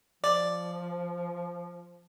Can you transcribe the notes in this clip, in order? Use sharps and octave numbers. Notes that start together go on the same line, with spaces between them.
F3 D5